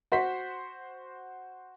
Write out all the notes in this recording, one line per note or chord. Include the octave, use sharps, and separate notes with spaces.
F#4 C5 F#5 B6